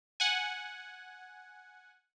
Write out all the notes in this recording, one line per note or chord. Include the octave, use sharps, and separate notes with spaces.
F#5 G#5